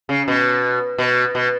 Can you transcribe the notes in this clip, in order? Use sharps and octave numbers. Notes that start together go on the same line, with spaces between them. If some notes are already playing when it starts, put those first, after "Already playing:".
C#3
B2
B2
B2